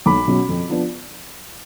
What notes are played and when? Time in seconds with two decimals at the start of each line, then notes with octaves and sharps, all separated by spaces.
0.06 B1 B5 D6
0.28 B2 F#3 C#4
0.49 F2
0.69 F3 B3 D4